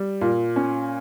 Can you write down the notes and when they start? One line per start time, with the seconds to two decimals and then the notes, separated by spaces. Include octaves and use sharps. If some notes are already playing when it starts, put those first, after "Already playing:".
Already playing: G3
0.21 A#2
0.56 C#4